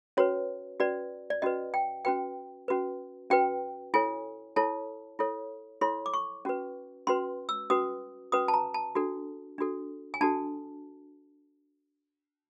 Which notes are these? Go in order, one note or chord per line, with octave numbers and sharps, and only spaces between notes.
C#4 F#4 B4 C#5
C#4 F#4 B4 D5
D5
C#4 F#4 B4 D#5
G5
C#4 F#4 B4 G5
C#4 F#4 B4
C#4 F#4 B4 G5
E4 A4 C#5 G#5
E4 A4 C#5 A5
E4 A4 C#5
E4 A4 C#5 C6
D6
C#6
C#4 F#4 B4
C#4 F#4 B4 C6
E6
C#4 F#4 B4 D#6
C#4 F#4 B4 D#6
A5
A#5
A5
D4 F#4 A4
D4 F#4 A4
G#5
D4 F#4 A4 A5